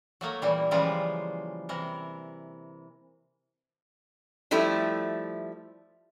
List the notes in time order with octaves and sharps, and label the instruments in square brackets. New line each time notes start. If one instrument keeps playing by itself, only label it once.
[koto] F#3 A3 A#3
A#2 E3 G3
C#3 E3 F3 G3 G#3 F4
C3 E3 A#4
[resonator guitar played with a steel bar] F3 G3 A3 E4